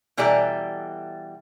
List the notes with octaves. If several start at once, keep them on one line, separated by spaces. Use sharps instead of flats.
B2 E3 G3 A4 D5 A#5